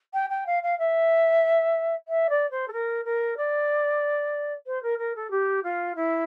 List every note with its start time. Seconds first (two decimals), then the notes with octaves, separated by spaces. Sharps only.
0.14 G5
0.30 G5
0.47 F5
0.63 F5
0.79 E5
2.08 E5
2.30 D5
2.51 C5
2.68 A4
2.73 A#4
3.05 A#4
3.37 D5
4.67 C5
4.83 A#4
4.98 A#4
5.16 A4
5.31 G4
5.64 F4
5.96 E4